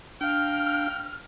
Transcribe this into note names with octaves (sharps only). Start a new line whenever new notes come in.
D4 F5 G5 F6